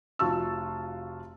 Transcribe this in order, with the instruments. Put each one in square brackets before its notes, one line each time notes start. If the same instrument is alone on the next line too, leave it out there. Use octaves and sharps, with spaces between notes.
[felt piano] F1 F4 F#4 A5 C#6 E6